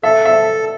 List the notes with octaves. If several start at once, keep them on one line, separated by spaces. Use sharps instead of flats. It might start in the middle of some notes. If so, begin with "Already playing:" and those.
A4 E5
E5